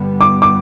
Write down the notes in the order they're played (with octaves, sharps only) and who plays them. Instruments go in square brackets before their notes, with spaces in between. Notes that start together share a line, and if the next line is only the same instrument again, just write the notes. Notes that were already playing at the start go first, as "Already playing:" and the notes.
Already playing: [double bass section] G2 D3 G3 B3
[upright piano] D6
D6